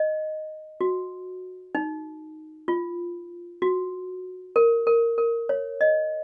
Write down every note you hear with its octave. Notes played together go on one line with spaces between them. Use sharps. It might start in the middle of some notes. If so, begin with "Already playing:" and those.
Already playing: D#5
F#4
D#4
F4
F#4
A#4
A#4
A#4
C#5
D#5